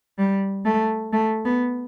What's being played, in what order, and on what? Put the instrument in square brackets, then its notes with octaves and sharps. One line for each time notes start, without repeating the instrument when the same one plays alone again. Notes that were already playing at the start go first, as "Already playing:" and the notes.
[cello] G3
A3
A3
B3